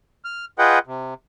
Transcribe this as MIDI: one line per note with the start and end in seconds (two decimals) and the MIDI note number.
0.25 0.45 89
0.59 0.79 65
0.59 0.79 68
0.59 0.79 71
0.59 0.79 75
0.59 0.79 78
0.59 0.79 79
0.87 1.14 48